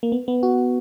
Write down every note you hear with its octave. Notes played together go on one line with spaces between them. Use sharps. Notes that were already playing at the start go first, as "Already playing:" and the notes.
A#3
B3
B3
F#4